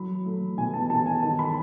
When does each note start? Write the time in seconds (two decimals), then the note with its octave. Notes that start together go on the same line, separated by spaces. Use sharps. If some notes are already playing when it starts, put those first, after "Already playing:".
Already playing: F#3 B5
0.25 A3
0.57 B2 G#5
0.74 A5
0.90 B2 A5
1.06 G#5
1.22 D#3 A5
1.39 B5